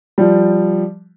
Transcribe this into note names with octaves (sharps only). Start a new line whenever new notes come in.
F3 G3